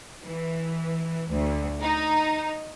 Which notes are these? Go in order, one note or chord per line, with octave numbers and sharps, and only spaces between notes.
E3
D2
D#4